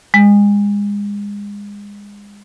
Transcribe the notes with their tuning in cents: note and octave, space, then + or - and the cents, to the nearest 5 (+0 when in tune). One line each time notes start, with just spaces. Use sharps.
G#3 -30